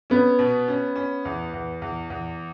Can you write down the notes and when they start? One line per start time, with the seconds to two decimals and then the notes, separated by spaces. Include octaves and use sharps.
0.10 B3 C#4
0.39 B2
0.68 C#4
0.96 C#4
1.25 E2
1.53 E2
1.82 E2
2.10 E2